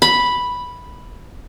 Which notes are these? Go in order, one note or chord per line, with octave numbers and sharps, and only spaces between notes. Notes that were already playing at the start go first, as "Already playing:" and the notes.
B5